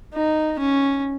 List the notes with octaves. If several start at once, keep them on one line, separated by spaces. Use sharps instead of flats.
D#4
C#4